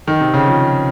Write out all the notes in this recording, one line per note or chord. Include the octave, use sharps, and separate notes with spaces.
D#3
C3
C#3
F3